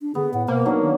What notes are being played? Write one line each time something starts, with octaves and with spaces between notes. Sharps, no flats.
D4
D3 B3 G#4
A2 F#5
B2 A#3 C5
F#3 D4 D#4
D#3